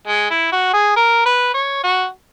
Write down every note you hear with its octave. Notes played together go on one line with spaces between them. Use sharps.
G#3
E4
F#4
G#4
A#4
B4
C#5
F#4